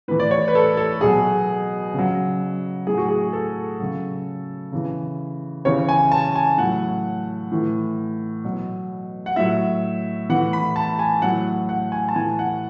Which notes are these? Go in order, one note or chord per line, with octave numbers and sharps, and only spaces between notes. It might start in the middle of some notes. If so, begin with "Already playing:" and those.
A2 E3 B4
D5
C#5
B4
A4
A4
B2 F#3 G#4
C#3 F#3
A2 F#3 G#4
F#4
G#4
A4
C#3 F#3
C#3 E3
C#3 E3 C#5
G#5
A5
G#5
A2 F#3 F#5
A2 E3
B2 F#3
F#5
A2 F#3 E5
A2 E3 F#5
B5
A5
G#5
A2 F#3 F#5
F#5
G#5
A5
A2 E3 G#5
F#5